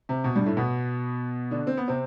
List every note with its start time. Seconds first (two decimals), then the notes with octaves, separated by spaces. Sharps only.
0.09 C3
0.24 B2
0.36 G2 G3
0.46 A2 A3
0.57 B2 B3
1.51 D3 D4
1.67 C4
1.77 B3
1.88 C3 C4